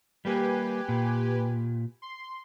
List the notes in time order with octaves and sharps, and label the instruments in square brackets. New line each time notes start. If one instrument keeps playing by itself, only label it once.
[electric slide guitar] G3 A#3 [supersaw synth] G4 B4 G#5
[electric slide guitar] A#2
[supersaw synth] C6